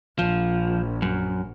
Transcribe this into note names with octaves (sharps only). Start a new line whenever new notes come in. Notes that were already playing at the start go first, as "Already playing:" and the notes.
A#1 F3
F#2